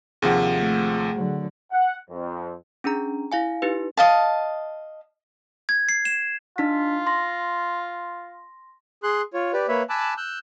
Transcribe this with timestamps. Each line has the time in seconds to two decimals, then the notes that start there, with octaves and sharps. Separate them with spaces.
0.22 D#2 C3 F3 G#4 F#5
0.55 A3
1.14 D3 F#3
1.72 F#5
2.09 F2
2.84 C#4 D4 G#4 A#5
3.32 E4 F5 G#5
3.62 D#4 E4 G4 B4
3.97 D#5 F5 A5
5.69 G#6
5.89 C7
6.05 E7
6.58 D4 D#4 F4 B6
7.07 C6 A#6
9.03 G#4 C6 F#6
9.34 F4 C#5
9.53 G4 B4 D5
9.68 A#3 B4 C#5 E5 B5
9.89 G#5 A5 B5 D6 E6 F#6
10.17 E6 F#6 G6